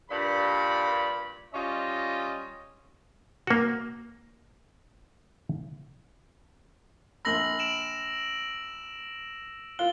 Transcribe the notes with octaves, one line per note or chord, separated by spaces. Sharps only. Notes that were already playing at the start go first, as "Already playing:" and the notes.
G2 A#2 B5
G3 C#4 F4 C#5 D#5
A#3 F#4
A#1 B5 E6 A#6 F#7
D7 E7 F#7
F4 G7